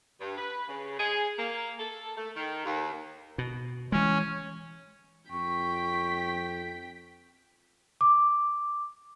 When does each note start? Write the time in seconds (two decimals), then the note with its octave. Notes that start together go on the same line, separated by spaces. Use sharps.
0.21 G2
0.37 B4
0.68 C#3
0.99 G#4
1.38 A#3
1.79 A4
2.17 A3
2.36 D#3
2.65 D#2
3.38 B2
3.92 E3 G#3 C#4
5.31 F2 G5 C#6 B6
8.01 D6